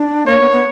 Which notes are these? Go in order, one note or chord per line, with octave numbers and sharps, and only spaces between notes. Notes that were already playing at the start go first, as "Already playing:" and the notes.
Already playing: D4
A#3 C#5
B3
B3